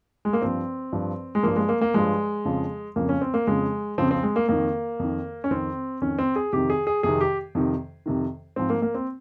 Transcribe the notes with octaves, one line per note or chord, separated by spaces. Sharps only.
G#3
A#3
G2 F3 C4
G2 F3
G#3
G2 F3 A#3
G#3
A#3
A#3
G2 F3 G#3
F2 C#3 F3
F2 C#3 F3 A#3
C#4
C4
A#3
F2 C#3 F3 G#3
F2 C#3 F3 C4
C4
G#3
A#3
F2 D#3 A#3
F2 D#3
C#4
F2 D#3 C4
F2 D#3 C#4
C4
G#4
F2 C3 D#3 G4
G#4
G#4
F2 C3 D#3 G#4
G4
F2 C3 D#3
F2 C3 D#3
G#2 F3 C4
A#3
A#3
C4